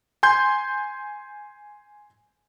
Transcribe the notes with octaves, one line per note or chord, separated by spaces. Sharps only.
G#5 C6 G6